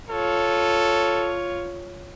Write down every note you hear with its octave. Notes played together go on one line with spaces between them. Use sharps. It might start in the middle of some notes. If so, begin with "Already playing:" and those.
F4 A4 C#5